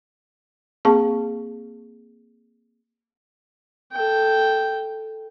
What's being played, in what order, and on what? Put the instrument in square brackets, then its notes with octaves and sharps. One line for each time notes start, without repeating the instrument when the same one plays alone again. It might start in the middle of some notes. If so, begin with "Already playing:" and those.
[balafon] A#3 C4 G#4 F5 A5 C#6
[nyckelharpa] A4 G5